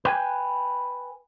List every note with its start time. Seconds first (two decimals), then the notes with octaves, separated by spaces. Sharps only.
0.05 B4 G5 G#5